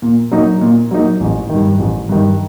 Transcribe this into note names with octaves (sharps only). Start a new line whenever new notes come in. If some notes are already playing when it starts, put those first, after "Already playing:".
A#2
F#3 A#3 D#4
A#2
F#3 A#3 D#4
A1
G2 D#3
A1
G2 D#3